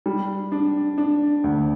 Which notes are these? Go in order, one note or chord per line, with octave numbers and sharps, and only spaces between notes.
G3
D4
D4
D2